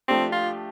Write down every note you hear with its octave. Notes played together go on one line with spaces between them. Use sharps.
F3 A3 C4 D4 G4
F4